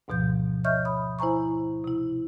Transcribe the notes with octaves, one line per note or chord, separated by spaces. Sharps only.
D2 G#2 B2 F3 G6
C#5 D#5 E5 C#6 F6 G6
B5 D#6
E4 C5 G#5 A#5 C#6
C3 E4